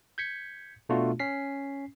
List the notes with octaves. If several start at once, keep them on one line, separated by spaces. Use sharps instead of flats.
G6 G#6 B6 C#7
B2 A3 B3 D4 F4 F#4
C#4 B6 C7